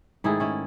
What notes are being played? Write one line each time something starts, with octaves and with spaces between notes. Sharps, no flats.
G#2 D#3 A3 E4 G#4
C#4 E4